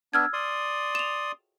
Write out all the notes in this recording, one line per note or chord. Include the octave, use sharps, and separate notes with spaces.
B3 D4 E6 F6 G#6
D5 C6 D#6
E7 F7